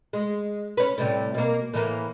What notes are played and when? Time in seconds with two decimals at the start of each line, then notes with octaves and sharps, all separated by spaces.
0.13 G#3
0.77 C#4 B4
0.98 A2 C3 G3
1.34 B2 A#3
1.74 A2 E3 A#3